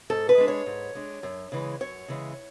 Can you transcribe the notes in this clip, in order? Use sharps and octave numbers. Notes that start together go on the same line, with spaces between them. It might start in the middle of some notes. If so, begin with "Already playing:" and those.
G#2 A4
B4
G#3 D4
C#5
G#2
G#3 D4
F#2
C#3 E3 G#3
F#2 C#5
C#3 E3 G#3